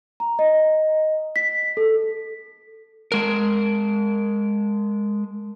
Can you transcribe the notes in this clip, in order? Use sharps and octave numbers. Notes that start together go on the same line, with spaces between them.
A#5
D#5
B6
A4
G#3 A#4